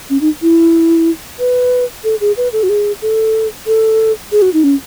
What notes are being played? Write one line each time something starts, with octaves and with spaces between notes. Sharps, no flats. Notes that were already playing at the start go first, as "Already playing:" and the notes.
C#4
D#4
E4
B4
A4
G#4
B4
A4
F#4
G#4
A4
A4
G#4
F#4
D#4
C#4